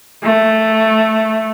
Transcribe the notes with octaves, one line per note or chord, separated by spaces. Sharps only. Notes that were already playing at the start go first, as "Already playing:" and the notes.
A3